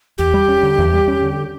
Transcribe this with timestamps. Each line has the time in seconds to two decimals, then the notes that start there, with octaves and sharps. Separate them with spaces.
0.18 E2 G4
0.34 G3
0.48 C#4
0.63 D3
0.78 E2
0.93 G3
1.08 C#4
1.22 D3